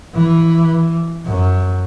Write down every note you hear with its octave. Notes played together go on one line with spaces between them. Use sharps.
E3
F#2